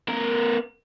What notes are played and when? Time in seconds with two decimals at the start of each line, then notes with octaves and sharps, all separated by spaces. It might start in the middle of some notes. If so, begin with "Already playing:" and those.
0.08 B3 A#4